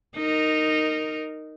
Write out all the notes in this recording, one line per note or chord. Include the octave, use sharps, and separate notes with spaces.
D#4 A#4